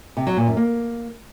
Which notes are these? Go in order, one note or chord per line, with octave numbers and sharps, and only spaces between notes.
C3
F#3
A#2
F#2
A#3